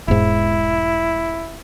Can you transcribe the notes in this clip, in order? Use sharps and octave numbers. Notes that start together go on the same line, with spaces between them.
E1 G#2 E4